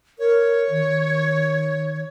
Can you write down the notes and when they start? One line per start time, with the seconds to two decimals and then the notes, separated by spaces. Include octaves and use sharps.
0.19 A#4 C#5
0.70 D#3